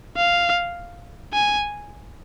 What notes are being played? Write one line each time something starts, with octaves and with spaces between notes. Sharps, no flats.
F5
G#5